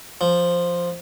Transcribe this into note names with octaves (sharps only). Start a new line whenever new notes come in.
F3